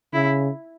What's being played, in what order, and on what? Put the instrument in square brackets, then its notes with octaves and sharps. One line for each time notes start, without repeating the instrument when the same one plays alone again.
[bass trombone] C#3 [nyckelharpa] E4